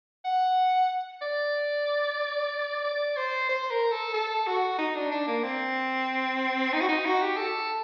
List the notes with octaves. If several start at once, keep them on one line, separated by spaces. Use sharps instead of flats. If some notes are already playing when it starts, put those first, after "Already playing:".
F#5
D5
D5
C5
C5
A#4
A4
A4
F#4
D#4
D4
D4
A#3
C4
D#4
F#4
D#4
F#4
G4
A4